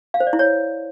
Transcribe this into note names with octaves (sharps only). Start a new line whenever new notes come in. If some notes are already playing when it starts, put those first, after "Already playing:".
F5
C5
D5
E4
C#5